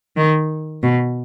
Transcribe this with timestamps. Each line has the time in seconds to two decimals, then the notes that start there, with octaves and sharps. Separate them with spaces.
0.17 D#3
0.83 B2